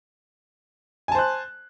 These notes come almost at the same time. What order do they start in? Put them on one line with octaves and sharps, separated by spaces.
G#5 A5 C5 F#6